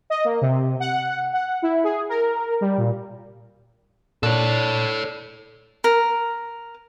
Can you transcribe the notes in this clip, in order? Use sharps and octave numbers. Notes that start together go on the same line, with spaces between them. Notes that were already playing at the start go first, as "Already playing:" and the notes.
D#5
A#3
C3
F#5
F#5
E4
G#4
A#4
G3
A#2
A#2 D4 A4 C#5
A#4